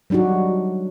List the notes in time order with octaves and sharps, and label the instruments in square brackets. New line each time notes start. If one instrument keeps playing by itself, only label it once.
[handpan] F#3 G3 D4 D#4 F#4